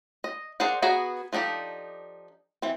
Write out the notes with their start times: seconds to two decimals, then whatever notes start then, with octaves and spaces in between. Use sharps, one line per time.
0.24 D#5
0.60 G#4 A#4 C5 D5 F#5
0.82 B3 F#4 G#4 B4 A#5
1.33 F3 D4 D#4 G4 A4
2.62 E3 C4